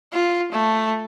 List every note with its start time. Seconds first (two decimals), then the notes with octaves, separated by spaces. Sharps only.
0.13 F4
0.52 A3